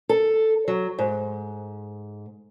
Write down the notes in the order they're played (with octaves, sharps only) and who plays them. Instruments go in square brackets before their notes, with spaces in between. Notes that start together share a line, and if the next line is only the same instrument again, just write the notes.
[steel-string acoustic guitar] A4
F#3
G#2